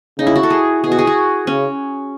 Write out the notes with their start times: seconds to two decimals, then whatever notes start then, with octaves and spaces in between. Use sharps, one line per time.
0.19 C#3 D#4
0.27 E4
0.36 F#4
0.43 A4
0.50 G#4
0.83 B2 G#4
0.92 F#4
0.99 G#4
1.07 F#4
1.47 C#3 C#4